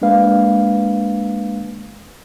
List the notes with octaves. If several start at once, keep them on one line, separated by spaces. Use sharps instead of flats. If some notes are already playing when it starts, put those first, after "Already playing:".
G#3 A#3 D4 B4 F5